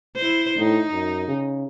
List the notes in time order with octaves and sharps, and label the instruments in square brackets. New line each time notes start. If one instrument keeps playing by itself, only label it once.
[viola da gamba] E4 C5
[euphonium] A2 [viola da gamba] D#4
[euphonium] F#2
C#3